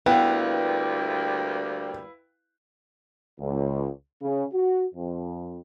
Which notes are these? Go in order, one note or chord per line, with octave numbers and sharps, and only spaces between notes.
D2 G3 A#3 B3 E4 B4 F5 G5
C#2
C#3
F#4
F2